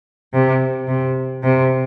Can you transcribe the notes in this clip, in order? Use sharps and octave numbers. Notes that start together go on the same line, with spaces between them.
C3
C3
C3